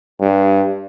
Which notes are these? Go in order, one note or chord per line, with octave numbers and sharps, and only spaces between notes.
G2